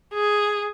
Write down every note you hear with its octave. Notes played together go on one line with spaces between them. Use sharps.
G#4